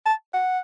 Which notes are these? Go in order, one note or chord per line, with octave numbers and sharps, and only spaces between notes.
A5
F#5